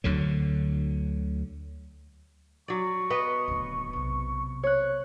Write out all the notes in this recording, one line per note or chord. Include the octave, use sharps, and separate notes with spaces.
D2 D3 F#3
F#3 D5 C#6
B3 B4 D#5
D1 C#3
B1 C3
C#5 F#6